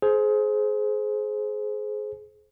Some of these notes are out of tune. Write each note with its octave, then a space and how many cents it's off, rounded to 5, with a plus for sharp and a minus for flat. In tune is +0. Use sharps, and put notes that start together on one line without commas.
G#4 +25 C5 +0